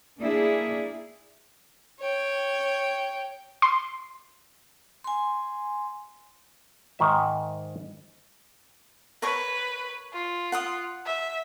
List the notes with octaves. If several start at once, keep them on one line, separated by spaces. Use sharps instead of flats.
A#3 D4 E4 G#4
C#5 G5
C6
G#5 C6
G#2 D#3 E5
A#4 B4 C#5 C#6
F4
F#5 C6 D#6
E5